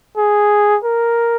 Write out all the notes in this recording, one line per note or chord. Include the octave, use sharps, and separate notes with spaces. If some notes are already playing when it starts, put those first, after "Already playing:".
G#4
A#4